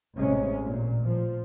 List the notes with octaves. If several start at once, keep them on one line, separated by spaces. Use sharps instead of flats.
A1 C3 G#3 C#4
A#2
F3